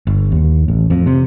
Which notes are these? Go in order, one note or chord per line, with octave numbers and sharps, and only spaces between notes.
G1
D#2
A1
F2
C3